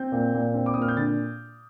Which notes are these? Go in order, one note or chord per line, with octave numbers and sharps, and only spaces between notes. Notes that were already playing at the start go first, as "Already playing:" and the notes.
Already playing: C4 G6
A#2
A#2
C4
D6
A#2 D#6
F6
G6
D3 A6